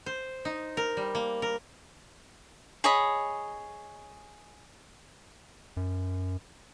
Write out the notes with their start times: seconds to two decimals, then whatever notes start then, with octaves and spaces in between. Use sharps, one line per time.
0.06 C5
0.45 D#4
0.77 A#4
0.97 G3
1.15 A#3
1.42 A#4
2.84 G#4 C#5 D#5 B5
5.77 F#2